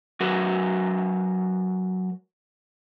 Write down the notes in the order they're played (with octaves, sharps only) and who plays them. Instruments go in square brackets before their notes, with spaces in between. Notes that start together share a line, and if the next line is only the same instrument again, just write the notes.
[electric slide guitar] F#3 F#4 A#4 B4